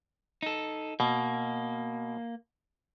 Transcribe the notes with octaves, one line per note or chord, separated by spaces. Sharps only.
D#4 A4
B2 A#3